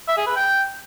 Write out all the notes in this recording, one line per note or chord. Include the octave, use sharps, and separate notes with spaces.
E5
G#4
B4
G5